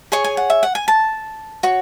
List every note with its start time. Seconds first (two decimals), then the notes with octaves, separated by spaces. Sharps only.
0.12 G#4 C#5 C#6
0.24 G#5
0.37 F#5
0.50 E5
0.63 F#5
0.75 G#5
0.88 A5
1.63 F#4 C#5